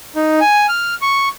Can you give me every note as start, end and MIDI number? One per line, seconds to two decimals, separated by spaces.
0.16 0.40 63
0.40 0.66 80
0.69 0.94 89
1.02 1.29 85